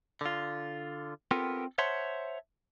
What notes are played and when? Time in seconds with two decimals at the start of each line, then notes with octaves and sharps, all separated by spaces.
0.21 D3 F4
1.31 B3 C4 F4 G4 A4 A#4
1.78 C5 C#5 E5 F#5 A5 C6